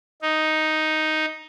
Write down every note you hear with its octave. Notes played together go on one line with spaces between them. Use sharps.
D#4